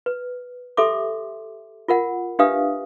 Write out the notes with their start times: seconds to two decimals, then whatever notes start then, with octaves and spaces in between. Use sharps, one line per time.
0.06 B4
0.77 G4 A4 E5 C6 D6
1.88 F4 A#4 F#5
2.39 D4 G4 B4 E5 F5 D#6